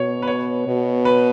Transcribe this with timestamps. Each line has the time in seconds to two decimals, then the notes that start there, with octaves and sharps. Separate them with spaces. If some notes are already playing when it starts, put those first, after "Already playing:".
Already playing: B2 C#5
0.22 B4
0.27 C#5
0.67 B2
1.05 B4